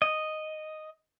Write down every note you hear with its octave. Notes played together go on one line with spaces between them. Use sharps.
D#5